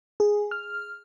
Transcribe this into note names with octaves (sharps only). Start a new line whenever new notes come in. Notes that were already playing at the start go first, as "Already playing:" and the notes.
G#4
F6